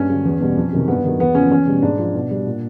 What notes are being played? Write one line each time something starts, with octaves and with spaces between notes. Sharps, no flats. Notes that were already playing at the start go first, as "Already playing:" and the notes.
Already playing: G2 C#4
D3 F#3
E2
B2 G3
F2
C3 D#3 F#3
G2 B3
D#3 F#3
E2 B3
C#3 F3 C#4
E2 C#4
B2 G3
G#2 D4
F3
B2
G3
A#2